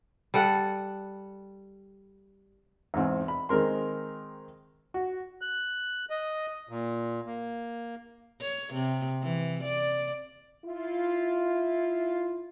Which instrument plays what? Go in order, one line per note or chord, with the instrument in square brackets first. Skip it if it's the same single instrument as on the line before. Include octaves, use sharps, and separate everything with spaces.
[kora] G3 A4 F#5
[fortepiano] E2 G#2 C4
B5
D#3 G#3 C4 A#4 C6
F#4
[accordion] F#6
D#5
A#2
A#3
[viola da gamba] C#5
C3
E3
D5
[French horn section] E4 F4